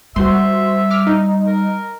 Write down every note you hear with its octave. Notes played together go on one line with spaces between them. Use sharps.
G3 F#4 C5 E5 C6
D6 F6 B6
D#4
A#4